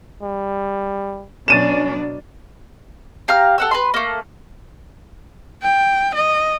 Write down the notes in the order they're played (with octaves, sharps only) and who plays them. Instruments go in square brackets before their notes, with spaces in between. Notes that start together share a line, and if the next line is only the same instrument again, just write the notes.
[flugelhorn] G3
[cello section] B2 F#3 D4 [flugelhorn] C#4 [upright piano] A6 D#7 E7
[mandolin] G4 F5 A#5 F6
A4 F#5 E6
B4 B5 C6
A3 A#3
[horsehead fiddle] G5
D#5